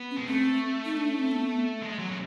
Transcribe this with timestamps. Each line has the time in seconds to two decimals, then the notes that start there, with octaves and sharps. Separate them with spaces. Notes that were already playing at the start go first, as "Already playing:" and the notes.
Already playing: B3
0.11 C#4
0.17 G#3
0.28 A3 C4
0.85 D#4
0.97 D4
1.08 C#4
1.19 C4
1.31 B3
1.82 G#3
1.99 F#3
2.11 C#3